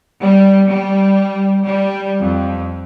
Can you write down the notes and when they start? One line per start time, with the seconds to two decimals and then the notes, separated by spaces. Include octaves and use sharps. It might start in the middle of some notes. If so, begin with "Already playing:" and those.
0.22 G3
0.68 G3
1.66 G3
2.20 F2